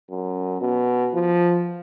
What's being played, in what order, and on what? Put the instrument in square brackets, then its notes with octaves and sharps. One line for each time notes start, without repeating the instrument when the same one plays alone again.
[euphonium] F#2
B2
F3